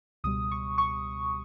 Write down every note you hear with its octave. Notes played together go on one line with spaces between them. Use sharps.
C#2 B2 G3 D#6
C#6
C#6